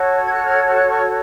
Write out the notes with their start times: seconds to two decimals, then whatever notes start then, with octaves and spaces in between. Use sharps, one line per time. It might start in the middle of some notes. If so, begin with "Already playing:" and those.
Already playing: F#4 A4 C#5
0.24 G#6
0.34 F#6
0.44 F6 G#6
0.66 F6
0.77 F#6
0.88 C#6 F6